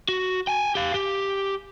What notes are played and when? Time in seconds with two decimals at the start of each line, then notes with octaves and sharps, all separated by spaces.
0.09 F#4
0.47 G5 G#5
0.75 G4 F5
0.94 G4